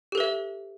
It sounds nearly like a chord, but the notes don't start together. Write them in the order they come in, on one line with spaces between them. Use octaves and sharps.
G4 A4 B4 E5